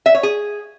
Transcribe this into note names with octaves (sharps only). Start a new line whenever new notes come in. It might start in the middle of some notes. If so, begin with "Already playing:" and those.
E5
C#5
G#4